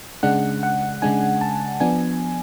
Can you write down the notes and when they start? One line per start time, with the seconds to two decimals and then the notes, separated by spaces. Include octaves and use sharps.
0.23 C#3 G#3 D4 F#5
0.63 F#5
1.02 C#3 G#3 D4 G#5
1.41 A5
1.80 F3 B3 D4 G#5